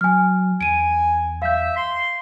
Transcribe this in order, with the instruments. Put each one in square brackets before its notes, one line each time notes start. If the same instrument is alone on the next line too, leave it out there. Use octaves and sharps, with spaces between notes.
[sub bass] F#3 [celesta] G#5 F6
[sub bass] E2 [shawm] G#5 [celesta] D7 D#7
[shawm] E5 [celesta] F5 G6
[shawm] C6